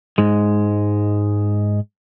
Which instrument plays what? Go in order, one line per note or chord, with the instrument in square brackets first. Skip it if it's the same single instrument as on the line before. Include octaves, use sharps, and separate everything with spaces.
[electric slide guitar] G#2 G#3